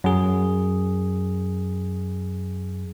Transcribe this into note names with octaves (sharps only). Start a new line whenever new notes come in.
F#2 G#4